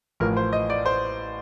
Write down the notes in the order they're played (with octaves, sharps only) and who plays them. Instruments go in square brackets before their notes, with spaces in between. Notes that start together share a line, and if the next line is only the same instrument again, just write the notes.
[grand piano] A1 A2 F3 A#4
C5
D#5
D5
C5